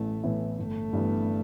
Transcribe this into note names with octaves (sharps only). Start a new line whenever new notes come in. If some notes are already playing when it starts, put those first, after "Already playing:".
Already playing: A1 A2 E3 A3 B3
A2 E3 B3 E4
G1 A3
G2 E3 B3